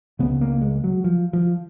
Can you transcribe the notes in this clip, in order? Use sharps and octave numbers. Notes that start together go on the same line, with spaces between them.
C#2 C#3 B3
A#3
G#3
F#3
F3
F3